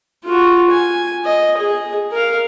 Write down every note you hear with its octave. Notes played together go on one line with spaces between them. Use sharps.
F4 F#4
G#5
D#5
G#4
A#4 F5